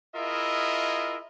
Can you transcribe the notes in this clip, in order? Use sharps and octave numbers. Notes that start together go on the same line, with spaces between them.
E4 F4 G#4 A#4 D#5 E5